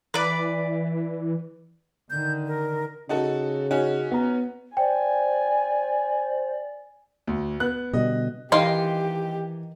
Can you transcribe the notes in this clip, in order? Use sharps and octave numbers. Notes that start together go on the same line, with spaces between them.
E3 B4 D5
D3 D#3 G6
A#4
C#3 D#4 F#4 A4
C#4 D#4 F#4
B3 A#5
C5 D5 G5 G#5
D2
B3 F#6
B2 D3 G3 D#5
D#3 E3 D#4 G4 F5 C6